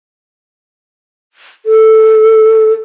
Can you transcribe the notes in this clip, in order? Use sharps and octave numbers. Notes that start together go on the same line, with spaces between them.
A4